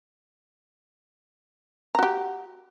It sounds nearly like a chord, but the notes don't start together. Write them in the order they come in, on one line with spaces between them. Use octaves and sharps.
A#5 F#4 G4